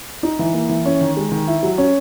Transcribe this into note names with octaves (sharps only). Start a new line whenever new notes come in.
D#4
E3
A#3
E3
C#4
D#3
G#3
D#3
E4
F#3
C#4